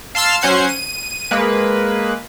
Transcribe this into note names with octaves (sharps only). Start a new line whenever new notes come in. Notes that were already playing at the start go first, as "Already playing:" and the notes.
F5 A5 C6 E6 F6
F#3 C#4 C5 F#5 G#6 C7
D#7
G#3 A#3 B4